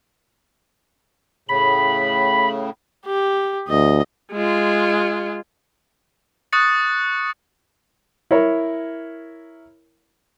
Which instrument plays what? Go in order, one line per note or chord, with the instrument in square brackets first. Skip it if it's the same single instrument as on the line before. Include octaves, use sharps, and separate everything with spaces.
[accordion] A2 C#3 [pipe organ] B5
[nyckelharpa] G4
[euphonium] D2 [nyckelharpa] D#5
[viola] G#3 F4
[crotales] C#6 D#6 F#6 A6 C#7
[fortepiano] E4 A#4 C#5